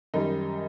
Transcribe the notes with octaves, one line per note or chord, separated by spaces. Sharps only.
F#2 D#3 G3 D#4